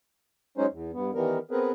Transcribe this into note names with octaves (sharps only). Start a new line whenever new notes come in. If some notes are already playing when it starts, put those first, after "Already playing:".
F#3 G#3 C#4 D#4 C5
E2
G2 B3
D#3 E3 G3 B3 A#4
B3 C4 G#4 A#4 B4